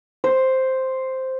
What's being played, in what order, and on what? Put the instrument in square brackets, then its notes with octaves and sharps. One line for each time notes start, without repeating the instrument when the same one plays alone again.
[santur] C5